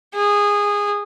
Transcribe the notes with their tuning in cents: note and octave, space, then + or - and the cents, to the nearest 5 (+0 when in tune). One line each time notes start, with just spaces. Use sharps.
G#4 -15